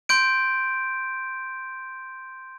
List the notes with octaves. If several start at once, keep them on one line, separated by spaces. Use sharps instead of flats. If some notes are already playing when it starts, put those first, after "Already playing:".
C6 G6 D7